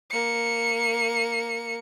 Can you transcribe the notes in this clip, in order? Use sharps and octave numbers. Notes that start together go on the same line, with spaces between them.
A#3 C#7